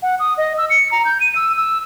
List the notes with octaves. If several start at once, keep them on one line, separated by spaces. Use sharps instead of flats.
F#5
D#6
D#5
E6
C#7
A#5
G6
D#7
E6
E6